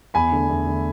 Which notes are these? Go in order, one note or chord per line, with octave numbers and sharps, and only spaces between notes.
E2 G#5 B5
D3 A3
E2
D3 A3